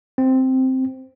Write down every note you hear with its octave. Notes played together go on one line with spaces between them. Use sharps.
C4